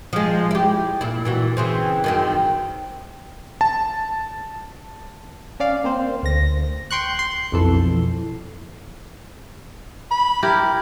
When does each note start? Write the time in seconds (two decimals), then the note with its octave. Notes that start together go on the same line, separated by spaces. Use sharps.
0.13 F3 G#3
0.51 E4 G4
1.01 A#2 E4
1.25 A#2 E3 F#4
1.57 C#3 E3 C4
2.04 F#2 D#3 C4
3.61 A5
5.60 C#4 D5 F5
5.84 A#3 C4 C5
6.23 D2 A#6
6.91 G5 C6 C#6 F#6
7.19 C6
7.52 B1 F2 E3 A4
10.11 B5
10.43 E4 G4 A#4